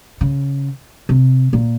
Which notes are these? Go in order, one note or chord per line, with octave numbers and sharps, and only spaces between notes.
C#3
C3
A#2